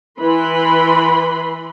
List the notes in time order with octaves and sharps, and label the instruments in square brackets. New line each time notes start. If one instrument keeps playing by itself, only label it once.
[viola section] E3 B4 B5 C6